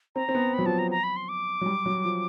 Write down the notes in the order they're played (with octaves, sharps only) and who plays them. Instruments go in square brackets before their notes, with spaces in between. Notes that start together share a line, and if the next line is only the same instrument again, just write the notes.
[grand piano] C4 [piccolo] A#5
[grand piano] C4
B3
[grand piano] F#3 [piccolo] B5
[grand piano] F3 [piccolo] A5
[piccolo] A#5
A#5
B5
C6
D6
[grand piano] F#3
G3
F#3
F3